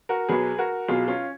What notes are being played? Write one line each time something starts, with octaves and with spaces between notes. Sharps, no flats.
F#4 A#4
B1 B2 F#3 G#4 B4
F#4 A#4
B1 B2 F#3 F4 G#4
C#4 F4